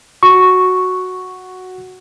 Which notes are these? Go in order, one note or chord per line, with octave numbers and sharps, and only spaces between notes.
F#4 C#6